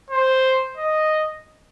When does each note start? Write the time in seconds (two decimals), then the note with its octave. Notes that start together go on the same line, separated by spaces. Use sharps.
0.10 C5
0.77 D#5